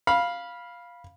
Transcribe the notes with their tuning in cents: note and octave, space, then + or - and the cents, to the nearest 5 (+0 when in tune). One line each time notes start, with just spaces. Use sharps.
F5 +0 B5 -15